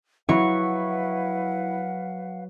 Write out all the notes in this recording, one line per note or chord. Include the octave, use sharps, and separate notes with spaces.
F#3 E4 B4 F5 F#5 C#6